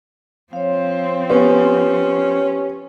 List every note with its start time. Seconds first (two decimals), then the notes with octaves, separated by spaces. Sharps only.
0.53 F3 C4 C#5 F5
1.30 B3 C#4 G4 G#5